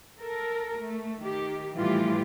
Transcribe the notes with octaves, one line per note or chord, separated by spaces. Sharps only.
A4 A#4
A3
D#3 G4
A2 E3 F3 G3 F4 G4